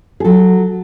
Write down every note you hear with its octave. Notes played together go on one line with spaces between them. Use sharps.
G#4
F#3 A4